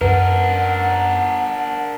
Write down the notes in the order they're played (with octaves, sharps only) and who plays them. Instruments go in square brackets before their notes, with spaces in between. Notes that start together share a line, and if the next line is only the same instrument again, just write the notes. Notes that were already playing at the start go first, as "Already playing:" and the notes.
[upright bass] F#2 C#4 [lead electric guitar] D4 A#4 [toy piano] B4 [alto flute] F#5